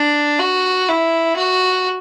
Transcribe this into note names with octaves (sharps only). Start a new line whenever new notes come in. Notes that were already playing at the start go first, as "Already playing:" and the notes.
Already playing: D4
F#4
E4
F#4